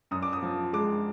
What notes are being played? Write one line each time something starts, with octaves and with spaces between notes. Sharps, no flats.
F#2 D#6
D6
D#6
F3
G#3 D6